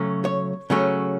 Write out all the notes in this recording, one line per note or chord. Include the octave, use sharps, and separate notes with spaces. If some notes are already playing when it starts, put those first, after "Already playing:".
Already playing: C#3 F#3 A3 C#4
C#5
C#3 F#3 A3 C#4